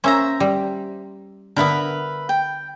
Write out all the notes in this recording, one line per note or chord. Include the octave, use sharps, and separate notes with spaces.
A#3 C#4 C5 E5 A#5
G3
D3 B3 A#4 B4 E5
G5